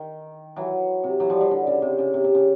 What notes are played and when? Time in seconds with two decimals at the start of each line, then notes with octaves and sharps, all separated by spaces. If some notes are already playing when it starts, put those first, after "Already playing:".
Already playing: D#3
0.56 E3 F#3
1.04 C3
1.20 E3 F#3
1.30 F3 G3
1.41 F3 G3
1.51 D3
1.67 C#3
1.82 C3
1.99 C#3
2.14 C3
2.24 C3
2.35 C#3